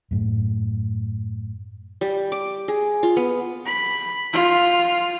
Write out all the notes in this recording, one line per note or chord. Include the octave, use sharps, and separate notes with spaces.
F#2 A2
G3
D6
G#4
F4
B3
B5
F4